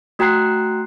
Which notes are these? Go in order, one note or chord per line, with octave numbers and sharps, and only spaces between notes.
A3 F#4 G5 A#5 F#6 C7